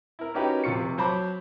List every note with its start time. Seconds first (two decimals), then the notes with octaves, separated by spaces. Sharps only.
0.19 E4 A#4
0.34 C#4 D#4 F#4 G4 A#4 B4
0.64 F1 C3 F4 C#6 C#7
0.98 F#3 C5 A5 B5 D6